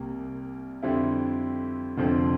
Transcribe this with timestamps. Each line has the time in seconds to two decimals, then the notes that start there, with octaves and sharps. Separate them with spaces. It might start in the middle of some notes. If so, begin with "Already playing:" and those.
Already playing: C2 C3 G3 A#3
0.83 F2 D3 G3 C4 E4
1.98 F1 F2 D3 F3 C4